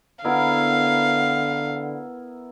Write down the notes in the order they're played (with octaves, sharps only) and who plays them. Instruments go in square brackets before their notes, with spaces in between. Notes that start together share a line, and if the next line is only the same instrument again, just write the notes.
[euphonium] D3 [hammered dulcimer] B3 E4 A#4 [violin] F5